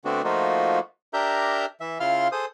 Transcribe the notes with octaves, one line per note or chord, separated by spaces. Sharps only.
D3 A3 B3 C4 D4 F#4
F3 A3 A#3 D#4 F4 F#4
D4 G4 A#4 E5 A#5 G6
E3 E5
C#3 E4 F4 F5 C6 F6
G#4 A4 C5 D#6